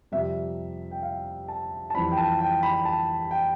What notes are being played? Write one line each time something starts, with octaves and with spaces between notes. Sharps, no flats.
F2 C3 G3 E5
G5
F5
A5
A5
F2 E3 G3 B5
G5
A5
G5
B5
A5
G5